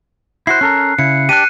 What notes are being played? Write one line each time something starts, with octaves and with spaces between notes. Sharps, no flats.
E4 F#4 C5 F#6 C7
C#4 A4 A#4
C#3 E4 C#7
D4 G4 F#6 D#7